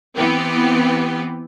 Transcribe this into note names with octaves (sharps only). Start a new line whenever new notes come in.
E3 B3 C4 G4